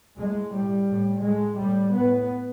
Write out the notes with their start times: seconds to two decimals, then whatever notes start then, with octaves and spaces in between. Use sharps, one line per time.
0.18 A2 G#3
0.53 A2 G3
0.89 A2
1.23 A2 G#3
1.59 A2 G3
1.93 A2 B3